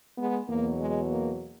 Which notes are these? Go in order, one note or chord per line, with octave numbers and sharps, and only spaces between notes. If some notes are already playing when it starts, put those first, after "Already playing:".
G#3 B3
E2 B2 F#3 A#3
G#3
A#3